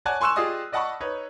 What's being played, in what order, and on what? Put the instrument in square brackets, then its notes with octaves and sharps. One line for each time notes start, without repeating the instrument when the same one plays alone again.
[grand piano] C#5 D5 F#5 G#5 A5 F#6
G#5 C6 C#6 E6 F#6 E7
F4 G4 G#4 D5 D#5 D#6
D5 D#5 F#5 A5 B5 C#6
D#4 B4 C#5